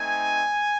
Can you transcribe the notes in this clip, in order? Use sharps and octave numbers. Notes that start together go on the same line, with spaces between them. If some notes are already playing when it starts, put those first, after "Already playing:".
Already playing: A3 C4 D#4 G#5